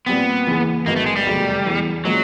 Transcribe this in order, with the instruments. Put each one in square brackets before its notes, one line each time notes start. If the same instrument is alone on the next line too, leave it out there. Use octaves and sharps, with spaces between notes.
[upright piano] A#2 G3 C4 [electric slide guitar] B3
[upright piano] D#2 C#3 E3
[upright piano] A1 G#2 D#3 F#3 B3 [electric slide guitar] A#3
[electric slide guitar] A3
G#3
G3
[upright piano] F1 E2 C#3 F#3
E2 C#3 E3
[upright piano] A#2 F3 G#3 C#4 [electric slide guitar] F#3